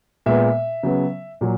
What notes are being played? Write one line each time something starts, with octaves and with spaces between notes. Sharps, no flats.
A#2 G#3 B3 E5
C#3 F#3 B3
A#2 F#3